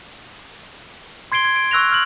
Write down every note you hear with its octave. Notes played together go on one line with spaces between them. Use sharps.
C6 G#6 C7 D7 G7
G#6
D7
C#6 E6 F#6 A#6 F7
F6 F#7